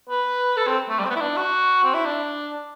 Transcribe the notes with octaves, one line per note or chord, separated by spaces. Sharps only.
B4
A4
C4
A3
G3
C4
B3
E4
D4
F#4
C4
E4
D4